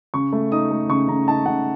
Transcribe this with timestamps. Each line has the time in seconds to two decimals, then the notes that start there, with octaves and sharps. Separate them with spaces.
0.14 C#3 C#6
0.33 A3
0.52 D#4 D#6
0.71 A3
0.89 C#3 C#6
1.08 C#3 A#5
1.28 D#4 A5
1.46 C#3 F#5